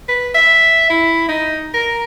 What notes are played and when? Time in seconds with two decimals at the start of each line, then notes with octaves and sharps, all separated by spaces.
0.09 B4
0.35 E5
0.90 E4
1.28 D#4
1.74 A#4